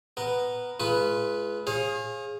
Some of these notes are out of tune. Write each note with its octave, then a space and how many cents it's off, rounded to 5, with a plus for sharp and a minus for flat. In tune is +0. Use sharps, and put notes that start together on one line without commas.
B3 +0 A#4 +0
G#3 +25 F4 -25 B4 +0
G#4 +0 C#5 -45 F5 +0